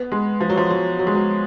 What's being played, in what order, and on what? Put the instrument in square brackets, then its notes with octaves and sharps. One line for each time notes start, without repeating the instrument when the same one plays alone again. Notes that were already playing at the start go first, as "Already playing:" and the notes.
Already playing: [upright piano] B3
G#3
F3
F#3
F3
F#3
F#3
G#3
F#3